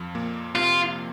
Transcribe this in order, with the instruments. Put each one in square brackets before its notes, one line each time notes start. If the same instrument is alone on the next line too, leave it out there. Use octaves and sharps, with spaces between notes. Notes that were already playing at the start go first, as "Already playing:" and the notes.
Already playing: [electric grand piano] F2 F3
A#2 A#3
[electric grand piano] C3 C4 [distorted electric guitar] F4